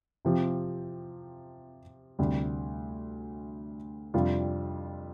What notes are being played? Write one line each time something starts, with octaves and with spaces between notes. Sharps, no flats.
C3 F3 C4 G4
D2 C3 G3
F2 C3 G3 D4 F4